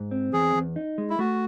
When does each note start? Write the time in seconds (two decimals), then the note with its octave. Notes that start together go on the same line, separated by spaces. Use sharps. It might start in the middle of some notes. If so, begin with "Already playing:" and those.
Already playing: G#2
0.11 C4
0.33 E2 G#4
0.55 E2
0.76 D#4
0.98 G#3
1.10 E4
1.19 A3 F#4